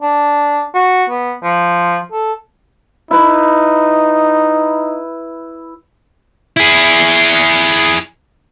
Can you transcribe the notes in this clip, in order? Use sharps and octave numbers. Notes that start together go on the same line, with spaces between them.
D4
F#4
B3
F3
A4
D#4 E4 B4
E4 G#4